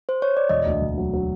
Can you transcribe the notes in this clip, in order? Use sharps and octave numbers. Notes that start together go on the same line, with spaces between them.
C5
C#5
D5
E1 D#5
D2
E1
F#3
F#3